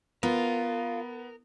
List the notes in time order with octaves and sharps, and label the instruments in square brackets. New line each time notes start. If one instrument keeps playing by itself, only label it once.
[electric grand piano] B3 [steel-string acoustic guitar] F4 [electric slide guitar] A#4